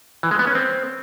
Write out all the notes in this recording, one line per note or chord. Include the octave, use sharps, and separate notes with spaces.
E3
G#3
B3
C#4
C4